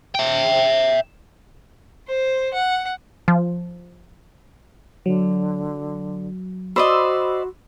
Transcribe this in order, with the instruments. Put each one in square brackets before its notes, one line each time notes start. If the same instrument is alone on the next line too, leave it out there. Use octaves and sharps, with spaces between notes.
[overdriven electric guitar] E5 G5
[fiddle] C5
F#5
[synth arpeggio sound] F3
[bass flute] D3 [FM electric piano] F#3
[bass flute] F#4 [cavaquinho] C5 D5 D#5 [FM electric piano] B5 C6 E6